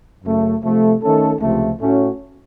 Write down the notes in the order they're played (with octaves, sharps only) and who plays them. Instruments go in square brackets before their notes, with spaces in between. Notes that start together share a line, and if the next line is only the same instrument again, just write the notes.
[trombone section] F#2 C#3 A3
C3 F3 A3
D#3 A3 C#4 A4
C#2 C3 F3 A3
A2 A3 C#4 F#4